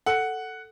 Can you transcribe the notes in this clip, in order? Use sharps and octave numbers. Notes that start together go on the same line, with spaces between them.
A4 F#5